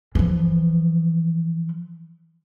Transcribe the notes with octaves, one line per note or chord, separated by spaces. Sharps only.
E3 F3